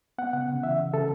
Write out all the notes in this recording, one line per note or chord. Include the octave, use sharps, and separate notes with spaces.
B3 F#5
C#3 F#5
C#3
E3 E5
C#3
C#3 A4